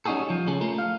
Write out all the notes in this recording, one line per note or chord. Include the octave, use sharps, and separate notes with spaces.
G3 C#4 D#4 F#4 G#4 A4
F3
C#2 C#4 G#4 A4
A3 F4 A4 A#4
F5